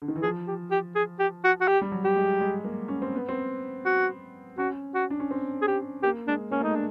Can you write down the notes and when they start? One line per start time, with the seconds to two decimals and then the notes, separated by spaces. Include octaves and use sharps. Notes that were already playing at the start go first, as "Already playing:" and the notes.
0.02 D3
0.08 D#3
0.16 E3
0.22 F3 G#4
0.47 G4
0.71 G4
0.96 G#4
1.19 G4
1.44 F#4
1.61 F#4
1.68 G4
1.81 G3
1.92 F#3
2.04 G4
2.16 G#3
2.41 G#3
2.64 A#3
2.88 C#4
3.02 C4
3.16 B3
3.29 C4
3.85 F#4
4.58 C#4 F#4
4.95 F#4
5.10 D4
5.20 C#4
5.31 C4
5.62 G#4
5.68 G4
6.03 A#3 G4
6.28 G#3 D4
6.51 A#3 C#4
6.61 A3 D#4
6.70 G#3
6.76 D4